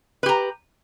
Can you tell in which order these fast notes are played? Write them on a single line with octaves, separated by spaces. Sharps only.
B4 G4 A#5